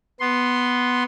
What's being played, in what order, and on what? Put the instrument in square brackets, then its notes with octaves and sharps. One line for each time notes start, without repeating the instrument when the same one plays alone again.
[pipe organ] B3 C6